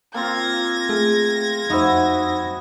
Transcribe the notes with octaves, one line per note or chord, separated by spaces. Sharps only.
A#3 C4 F4 G#6 A#6
A3 G#4
F2 D#4 E4 F#4 C5 D#5